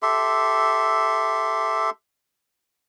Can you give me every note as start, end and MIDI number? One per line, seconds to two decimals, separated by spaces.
0.02 1.90 67
0.02 1.90 69
0.02 1.90 76
0.02 1.90 84